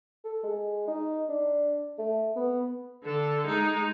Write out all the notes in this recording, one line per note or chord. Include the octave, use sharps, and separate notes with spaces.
A4
G#3
D#4
D4
A3
B3
D3 A4
G#3 D#4